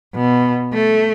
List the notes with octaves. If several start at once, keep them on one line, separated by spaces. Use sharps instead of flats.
B2
A3